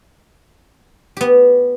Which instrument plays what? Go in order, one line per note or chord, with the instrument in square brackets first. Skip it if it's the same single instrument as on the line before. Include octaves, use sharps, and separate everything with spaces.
[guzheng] B3 G4